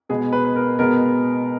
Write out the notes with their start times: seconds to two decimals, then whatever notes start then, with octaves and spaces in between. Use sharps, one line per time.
0.09 B2 G#3 B3 G#4
0.33 B4
0.45 B4
0.56 A#4
0.79 B2 G#3 B3 A#4